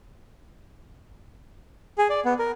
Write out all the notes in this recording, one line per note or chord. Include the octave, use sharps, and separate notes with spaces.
G#4
D5
B3
A#4